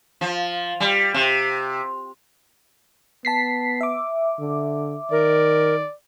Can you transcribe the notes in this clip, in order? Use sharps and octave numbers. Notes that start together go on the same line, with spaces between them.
F3
G3
C3
B3 A5 B6 C7
E5 D6
D3
D#3 A#4 D5